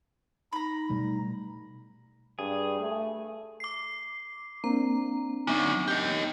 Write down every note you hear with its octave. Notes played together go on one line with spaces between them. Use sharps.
D#4 A#5 B5
B2 G3 A3
G2 G#4
A3
D6 C7
A#3 C4 D4 A#5
D3 F#3 B3 D#4
G4 D#5